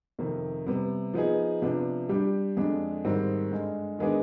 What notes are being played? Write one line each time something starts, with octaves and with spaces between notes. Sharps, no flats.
F2 C3 D#3
C3 G3 B3
F3 B3 D#4 G#4
C3 F3 B3 D4
G3 D4 G4
F2 D3 G#3 D4
G#2 D#3 G3 C4
G2 D3 G#3
D#3 G#3 B3 D4 G#4